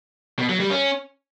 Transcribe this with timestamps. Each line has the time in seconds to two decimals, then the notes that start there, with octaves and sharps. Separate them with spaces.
0.39 B2
0.49 F#3
0.60 G3
0.70 C#4